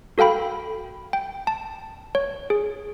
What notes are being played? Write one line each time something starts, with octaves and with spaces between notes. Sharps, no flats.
F#4 A4 F5 G5 B5
G5
A5
C#5
G#4